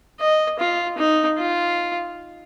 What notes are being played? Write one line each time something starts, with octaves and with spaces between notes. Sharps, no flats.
D#5
F4
D#4
F4